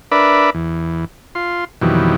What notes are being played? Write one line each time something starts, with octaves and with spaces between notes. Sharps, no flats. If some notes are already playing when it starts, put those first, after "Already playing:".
D4 A#4 B4 D5 E5 B5
E2
F4 C6
F2 B2 D#3 E3 F#3 G3